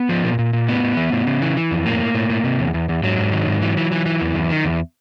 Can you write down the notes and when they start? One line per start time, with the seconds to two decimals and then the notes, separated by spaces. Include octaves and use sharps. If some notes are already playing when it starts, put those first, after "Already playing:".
Already playing: B3
0.09 F3
0.24 A#2
0.39 A#2
0.53 A#2
0.68 A2 B3
0.83 A2
0.97 E3
1.12 A2
1.27 C#3
1.42 E3
1.57 E3
1.71 F2
1.86 A2 A#3
2.00 A2
2.15 A2
2.30 A2
2.44 C3
2.59 E2
2.74 E2
2.89 E2
3.03 G#2 F#3
3.18 G#2
3.32 D#3
3.47 G#2
3.62 E3
3.77 E3
3.92 E3
4.06 E3
4.21 E2
4.35 E2
4.50 D#3
4.65 E2